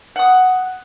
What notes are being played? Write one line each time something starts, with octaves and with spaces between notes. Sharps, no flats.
F#5 D#6